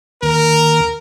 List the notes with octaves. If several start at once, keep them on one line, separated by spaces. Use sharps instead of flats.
D#2 A#4